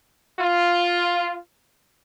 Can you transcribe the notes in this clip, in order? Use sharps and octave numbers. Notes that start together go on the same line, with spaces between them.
F4